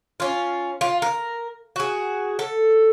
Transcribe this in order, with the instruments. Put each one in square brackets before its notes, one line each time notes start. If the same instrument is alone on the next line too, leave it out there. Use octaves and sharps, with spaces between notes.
[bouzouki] C#4 F4
F4
A#4
F#4 G#4
A4